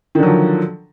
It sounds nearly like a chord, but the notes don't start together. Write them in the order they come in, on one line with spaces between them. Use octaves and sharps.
D#3 D3 F#3 F3